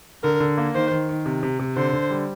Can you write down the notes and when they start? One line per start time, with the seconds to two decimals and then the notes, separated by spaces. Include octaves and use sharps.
0.24 D3 A#4
0.40 D3
0.58 A#3
0.74 D#3 C5
0.91 D#3
1.09 D#3
1.26 C3
1.43 C3
1.59 C3
1.75 D3 C5
1.93 D3
2.10 G3